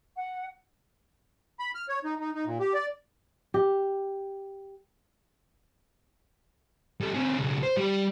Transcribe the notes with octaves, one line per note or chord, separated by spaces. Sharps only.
F#5
B5
F6
C#5
D#4
D#4
D#4
A#2
G4
D5
G4
G3 A3
C3 G#4
B1 C#3
C5
G3 G4